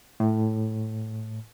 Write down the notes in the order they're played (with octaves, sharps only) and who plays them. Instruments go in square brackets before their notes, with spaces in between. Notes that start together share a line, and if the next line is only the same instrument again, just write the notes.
[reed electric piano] A2